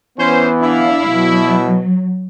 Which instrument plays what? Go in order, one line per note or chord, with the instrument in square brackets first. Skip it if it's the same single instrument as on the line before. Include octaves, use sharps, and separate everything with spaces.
[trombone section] E3 B3 [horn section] C#4 C5
[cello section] D4 F5 [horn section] E4
[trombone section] B2 [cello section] F#3